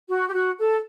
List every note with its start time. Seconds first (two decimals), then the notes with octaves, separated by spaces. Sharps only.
0.09 F#4
0.28 G4
0.33 F#4
0.57 A4